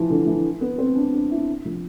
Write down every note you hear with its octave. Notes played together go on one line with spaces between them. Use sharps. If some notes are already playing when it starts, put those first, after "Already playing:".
Already playing: E3 F3
D3
E3
B3
C4
D4
D4
E4
F3